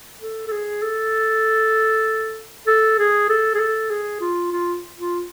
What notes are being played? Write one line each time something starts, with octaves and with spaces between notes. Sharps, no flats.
A4
A4
G#4
A4
A4
G#4
A4
G#4
A4
G#4
F4
F4
F4